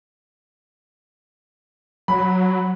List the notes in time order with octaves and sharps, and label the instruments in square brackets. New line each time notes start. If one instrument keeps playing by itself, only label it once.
[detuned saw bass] F#3 [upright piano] B5